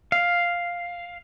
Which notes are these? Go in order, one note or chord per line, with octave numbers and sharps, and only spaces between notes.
F5